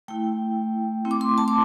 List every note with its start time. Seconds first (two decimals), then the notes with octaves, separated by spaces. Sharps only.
0.08 A3 E4 G5
1.05 A3 C4 E4
1.11 D6
1.21 C6
1.38 A5
1.48 D6